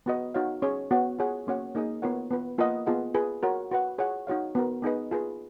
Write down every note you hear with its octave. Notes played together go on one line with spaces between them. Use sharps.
B3 F#4 B4 D#5
D#4 F#4 C#5 F5
C#4 G#4 C#5
B3 F#4 C#5 F#5
F4 G#4 C#5 F#5
A#3 C#4 F#4 C#5 F#5
A#3 D#4 G#4 D#5
B3 F4 A#4 C#5 F#5
B3 F4 B4
A#3 F4 B4 D#5 F#5
B3 F4 G#4 D#5 F#5
F4 G#4 B4
F#4 A#4 C#5 F#5
F#4 B4 F#5
F4 G#4 C#5 F#5
D#4 F#4 C#5 F5
B3 F#4 A#4
B3 D#4 G#4 B4 D#5
F4 G#4 B4